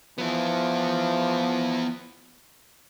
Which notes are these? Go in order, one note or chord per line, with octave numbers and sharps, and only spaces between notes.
F3 B3 E4